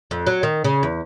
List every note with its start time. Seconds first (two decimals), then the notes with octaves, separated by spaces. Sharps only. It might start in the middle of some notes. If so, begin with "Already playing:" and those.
0.11 F2
0.27 F#3
0.43 D#3
0.64 C#3
0.83 E2